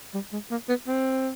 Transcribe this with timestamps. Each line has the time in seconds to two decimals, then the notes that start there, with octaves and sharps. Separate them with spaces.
0.14 G3
0.32 G#3
0.51 A#3
0.69 B3
0.87 C4